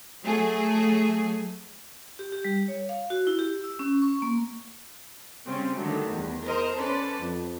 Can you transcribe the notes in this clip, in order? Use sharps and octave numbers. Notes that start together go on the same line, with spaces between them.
F#3 A3 G#4
G4
G4
G3
C#5
F5
F#4
E4
G4
E6
C#4
C#6
A#3
C#3 G3 C4 C#4
D3 D#3 F#3 G3 A3
E2
A#4 C5 D#5
C#4 A4 B4 C5 D5
F2